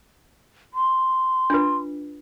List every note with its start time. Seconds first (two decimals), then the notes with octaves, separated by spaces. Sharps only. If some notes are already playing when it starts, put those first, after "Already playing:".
0.74 C6
1.50 D4 F4 B4